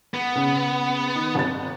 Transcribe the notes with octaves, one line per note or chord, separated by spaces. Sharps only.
B3
C#3 C#4
D#3
G1 C3 A6